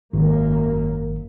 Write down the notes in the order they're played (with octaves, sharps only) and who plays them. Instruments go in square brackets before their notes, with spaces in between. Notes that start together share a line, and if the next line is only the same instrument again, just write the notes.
[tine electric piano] G#1 [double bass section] F#2 A#3